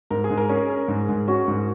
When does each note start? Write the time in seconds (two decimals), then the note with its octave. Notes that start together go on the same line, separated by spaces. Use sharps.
0.10 G#2 A#4
0.24 G#4
0.31 G#2
0.37 A#4
0.49 C#4 G#4
0.69 C#4
0.88 G#2
1.09 G#2
1.28 C#4 F#4
1.48 G#2